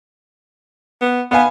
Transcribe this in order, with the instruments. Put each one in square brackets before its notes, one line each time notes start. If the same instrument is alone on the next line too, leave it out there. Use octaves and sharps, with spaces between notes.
[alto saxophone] B3
[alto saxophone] B3 [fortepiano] B4 F5 G#5